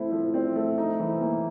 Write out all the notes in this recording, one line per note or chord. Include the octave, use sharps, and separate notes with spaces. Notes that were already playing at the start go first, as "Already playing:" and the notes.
Already playing: A3 C4 E4
F3
C4
A3
D#4
E3
A#3